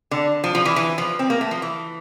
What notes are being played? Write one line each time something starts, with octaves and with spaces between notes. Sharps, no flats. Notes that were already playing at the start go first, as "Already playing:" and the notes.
D3
F3
F3
E3
E3
F3
C4
A#3
A3
F3
E3